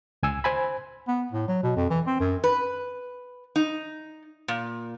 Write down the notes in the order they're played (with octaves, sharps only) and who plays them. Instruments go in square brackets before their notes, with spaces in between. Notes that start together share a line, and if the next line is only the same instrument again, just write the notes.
[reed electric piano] C#2 G#5 E6
C5 G#5 B5
[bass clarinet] B3
A2
F#3
B2
F2
E3
C4
F#2
[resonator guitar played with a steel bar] B4
D#4
A#2